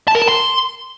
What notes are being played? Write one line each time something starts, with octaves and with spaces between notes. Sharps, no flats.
A5
A#4
A5
C6